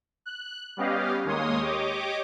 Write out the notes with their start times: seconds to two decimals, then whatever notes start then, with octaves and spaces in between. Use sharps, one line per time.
0.26 F#6
0.77 G3 B3 C#4 G4 D#5 F5
1.25 D#2 G#3 A#3 C#5 C6 D#6
1.61 G4 C#5 D#5 D6